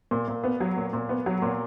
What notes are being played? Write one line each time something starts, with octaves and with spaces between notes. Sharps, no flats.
A#2
A#2
B3
F#3
A#2
A#2
B3
F#3
A#2